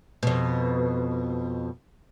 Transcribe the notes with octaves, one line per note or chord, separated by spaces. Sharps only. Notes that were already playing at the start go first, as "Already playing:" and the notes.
F2 B2